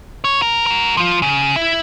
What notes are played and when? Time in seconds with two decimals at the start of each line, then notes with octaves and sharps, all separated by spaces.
0.24 C#5
0.42 A#4
0.66 F#4 A#4
0.97 F3 F4
1.22 C#3
1.56 E4